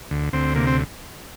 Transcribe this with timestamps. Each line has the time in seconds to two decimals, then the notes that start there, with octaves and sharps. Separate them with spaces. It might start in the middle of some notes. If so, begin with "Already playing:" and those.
0.11 D2
0.33 D2 C4
0.55 C3 A#3
0.67 C4